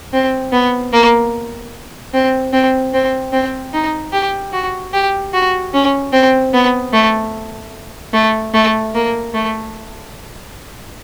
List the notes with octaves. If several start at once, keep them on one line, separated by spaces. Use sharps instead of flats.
C4
B3
A#3
C4
C4
C4
C4
D#4
G4
F#4
G4
F#4
C#4
C4
B3
A3
A3
A3
A#3
A3